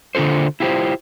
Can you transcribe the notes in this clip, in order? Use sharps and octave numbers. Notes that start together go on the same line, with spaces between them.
D3 D4 F4 A4 C5
E4 F4 G4 A#4 C5